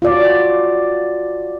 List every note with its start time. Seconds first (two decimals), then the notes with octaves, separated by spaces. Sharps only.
0.02 F4 F#4 D5